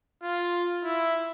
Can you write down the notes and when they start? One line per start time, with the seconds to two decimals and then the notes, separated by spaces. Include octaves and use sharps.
0.23 F4
0.84 E4